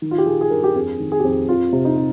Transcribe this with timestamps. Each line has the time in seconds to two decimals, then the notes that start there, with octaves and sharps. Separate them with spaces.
0.02 D#3
0.11 F4
0.18 G4
0.26 D#3 G#4
0.41 G#4
0.50 G2 A#4
0.64 G4
0.75 F2 G#4
1.00 D#3
1.12 G#4
1.19 G4
1.24 F2 G#4
1.49 F2 F4
1.73 C3
1.85 D#4
1.97 C3